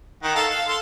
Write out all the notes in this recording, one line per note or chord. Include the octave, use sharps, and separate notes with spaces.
D#3 F#5
A4 F5 A5
F5
A4 C6